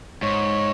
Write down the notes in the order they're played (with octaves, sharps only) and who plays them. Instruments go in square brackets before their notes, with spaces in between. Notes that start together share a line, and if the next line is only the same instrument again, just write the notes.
[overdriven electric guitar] G#2 [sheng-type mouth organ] C#5